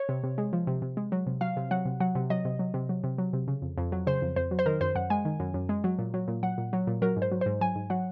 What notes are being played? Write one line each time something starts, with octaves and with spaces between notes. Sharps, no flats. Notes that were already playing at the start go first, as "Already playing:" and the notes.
Already playing: C#5
C3
C3
G#3
F3
C3
C3
G#3
F#3
C3
F#3 F5
C3
F#3 F#5
C3
F#3 F#5
C3
F#3 D#5
C3
F#3
C3
F#3
C3
F#3
C3
C#3
F2
F2
F#3
C#3 C5
F2
F2 C5
F#3
C5
D#3 A#4
F#2 C5
F#2 F#5
G#3 G#5
D#3
F#2
F#2
G#3
F#3
A#2
F#3
A#2
F#3 F#5
A#2
F#3
A#2
F#3 A#4
G#2
C5
F#3
G#2 C5
F#3 G#5
G#2
F#3 F#5